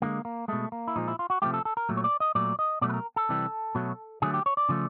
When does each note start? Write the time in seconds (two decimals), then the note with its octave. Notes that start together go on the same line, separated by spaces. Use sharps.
0.02 D3 F3 G#3 A#3
0.25 A#3
0.48 B2 G#3 A3
0.72 A#3
0.88 E4
0.96 A#2 F3 G#3 D#4
1.08 E4
1.19 F4
1.30 F#4
1.42 C3 F3 A3 G4
1.54 A4
1.65 A4
1.77 A#4
1.89 A#2 F#3 A3
1.97 C#5
2.04 D5
2.20 D#5
2.35 A#2 F#3 A3 D5
2.59 D#5
2.81 B2 F#3 A3 D5
2.89 B4
2.94 A#4
3.16 A4
3.29 C3 E3 G3
3.75 B2 F#3 A3
4.22 D3 F#3 A3 G#4
4.34 G4
4.46 C#5
4.57 D5
4.69 C#3 F3 A3